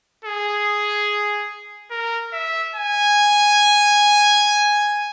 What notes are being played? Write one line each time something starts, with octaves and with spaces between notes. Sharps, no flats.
G#4
A#4
E5
G#5